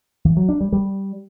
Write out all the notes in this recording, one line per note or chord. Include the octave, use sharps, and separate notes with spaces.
E3
F#3
D4
G3
G3